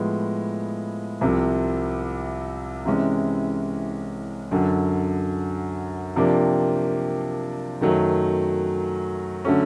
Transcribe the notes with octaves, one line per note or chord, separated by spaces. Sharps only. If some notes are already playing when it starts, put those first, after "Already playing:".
Already playing: A2 F3 G#3 B3
C2 C3 F3
C3 E3 G#3 C#4
F#2 D3 F#3
C3 F3 A#3 D4 G4
F#2 D#3 F#3 A3
D3 F#3 A3 C#4